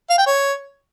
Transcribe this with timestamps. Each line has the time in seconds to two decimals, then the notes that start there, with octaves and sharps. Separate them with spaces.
0.10 F5
0.18 G5
0.27 C#5